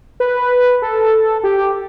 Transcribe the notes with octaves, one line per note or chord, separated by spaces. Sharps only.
B4
A4
G4